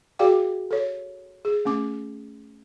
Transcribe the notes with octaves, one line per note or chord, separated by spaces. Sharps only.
F#4 G#4 D5 F5 G5 D6
A4 C#5
G#4
A3 C#4 D6